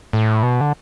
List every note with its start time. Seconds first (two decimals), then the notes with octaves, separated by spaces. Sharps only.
0.13 A2
0.43 B2
0.61 D3